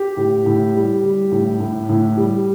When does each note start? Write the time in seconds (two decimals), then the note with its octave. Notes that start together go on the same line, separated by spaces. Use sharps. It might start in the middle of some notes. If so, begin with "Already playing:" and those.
Already playing: G4
0.17 A2
0.46 A2
0.75 G3
1.03 G3
1.32 A2
1.60 A2
1.89 A2
2.17 G3